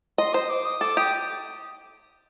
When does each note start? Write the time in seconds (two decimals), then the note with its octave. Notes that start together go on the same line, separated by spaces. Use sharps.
0.18 D#5 C6
0.33 C5 D#6
0.49 D6
0.65 D#6
0.81 A4 D6
0.97 G4 D#6